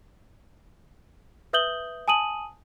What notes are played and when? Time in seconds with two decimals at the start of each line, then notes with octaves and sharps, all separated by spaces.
1.53 B4 E5 D#6 G6 F#7 G7
2.08 G#5 A5 D#6 D#7 F#7